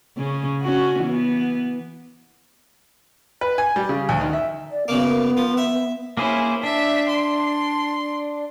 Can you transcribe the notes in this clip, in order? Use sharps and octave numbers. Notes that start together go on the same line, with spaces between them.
C#3 C#4
C#4 F#4
E3 B3
B4
G#5
G3
C#3
D2
D#3
E5
D5
F#2 C#3 A#3 B3
F3
E5
A#3 C#4 E4 G#4 C5
D4 E5
C6